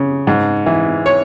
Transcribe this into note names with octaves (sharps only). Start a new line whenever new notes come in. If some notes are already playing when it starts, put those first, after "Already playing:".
Already playing: C#3
G#2
E3
C#5